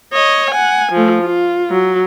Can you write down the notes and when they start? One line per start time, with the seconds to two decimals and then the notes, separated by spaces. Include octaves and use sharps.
0.13 C#5 D#5
0.51 F#5 G#5
0.92 F3 A3
1.23 F4
1.70 F#3